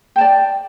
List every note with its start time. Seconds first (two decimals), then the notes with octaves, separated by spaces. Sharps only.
0.16 G5
0.18 A5
0.21 D5